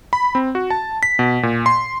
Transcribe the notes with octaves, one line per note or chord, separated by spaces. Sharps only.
B5
C4
F#4
A5
B6
B2
A#2
C6